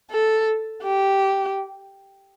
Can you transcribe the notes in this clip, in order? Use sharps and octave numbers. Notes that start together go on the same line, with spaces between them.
A4
G4